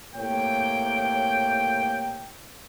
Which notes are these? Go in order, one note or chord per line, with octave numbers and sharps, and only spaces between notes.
A2 C3 A#3 C#5 G5